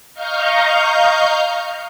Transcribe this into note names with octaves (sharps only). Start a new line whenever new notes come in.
D#5 F5 A#5 C#6 F6 G6